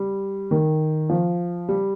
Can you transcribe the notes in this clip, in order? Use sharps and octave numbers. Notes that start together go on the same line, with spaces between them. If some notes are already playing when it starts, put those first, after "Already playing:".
Already playing: G3
D#3
F3
G3